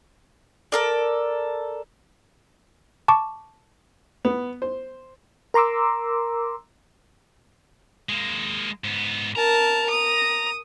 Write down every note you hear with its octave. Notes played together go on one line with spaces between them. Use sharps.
A4 A#4 D5
A5 C#6 D6
B3
C5
A#4 A#5 C6 D6 E6
G#3 A#3
G#2 B3
A#4 A5 A#5
D#6